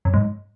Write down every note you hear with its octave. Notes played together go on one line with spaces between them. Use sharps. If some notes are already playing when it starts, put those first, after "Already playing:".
F#2
G#2